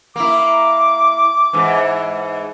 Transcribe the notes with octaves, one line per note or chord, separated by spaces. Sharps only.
A#3 E4 D6
G#2 E3